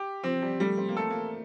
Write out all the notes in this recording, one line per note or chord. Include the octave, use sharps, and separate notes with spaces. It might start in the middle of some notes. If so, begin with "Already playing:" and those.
Already playing: G4
F3 C4
G3
G3 A3
C4
A#3
A3 A4
A#3